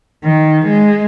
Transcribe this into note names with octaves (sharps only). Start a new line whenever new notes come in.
D#3
G#3